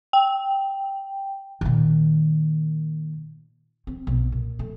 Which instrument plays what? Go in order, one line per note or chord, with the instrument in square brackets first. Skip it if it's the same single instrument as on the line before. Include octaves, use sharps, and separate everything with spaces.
[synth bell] G5
[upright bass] A#2 D#3
C4
B1
A#2
A3